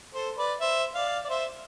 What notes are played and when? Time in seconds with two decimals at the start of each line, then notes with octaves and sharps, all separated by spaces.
0.14 A4 C5
0.38 B4 D5
0.60 C5 E5
0.95 D5 F5
1.25 D5
1.29 C5 E5